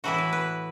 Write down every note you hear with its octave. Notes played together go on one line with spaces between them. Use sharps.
A2 E3 B3 E4 F#4
B4
B4